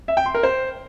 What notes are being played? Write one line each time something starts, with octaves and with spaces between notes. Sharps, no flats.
E5
G5
C6
A#4
C5